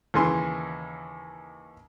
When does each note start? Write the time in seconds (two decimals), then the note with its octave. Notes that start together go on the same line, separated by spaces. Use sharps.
0.14 D#2 C#3 E3 G#5 C6